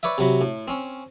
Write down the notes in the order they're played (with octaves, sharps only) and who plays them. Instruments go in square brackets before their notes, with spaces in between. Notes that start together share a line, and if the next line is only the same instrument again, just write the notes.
[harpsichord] B4 C#5 D5 E5
C3 F#3 B5
A2
C4 C#4